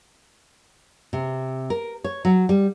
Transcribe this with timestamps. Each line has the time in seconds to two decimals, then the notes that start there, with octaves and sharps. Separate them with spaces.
1.13 C3
1.70 A#4
2.04 C#5
2.25 F#3
2.49 G3